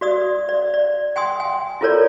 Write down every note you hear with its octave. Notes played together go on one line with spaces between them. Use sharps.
F#4 D5 D#6
D5
D5
G5 G#5 C6 D#6
G5 G#5
E4 F4 A4 A#4 C#5 D5